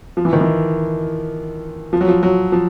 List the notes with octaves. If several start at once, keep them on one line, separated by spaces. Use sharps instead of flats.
F3
E3
D#3
E3
F3
F#3
F3
F#3
F3